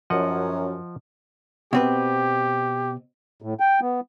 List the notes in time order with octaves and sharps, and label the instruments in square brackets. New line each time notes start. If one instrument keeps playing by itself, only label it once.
[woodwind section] F#2 [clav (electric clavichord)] F3 D#5 F#5
[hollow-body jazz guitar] B2 C4 B4 [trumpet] G4
[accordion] A2
G5
B3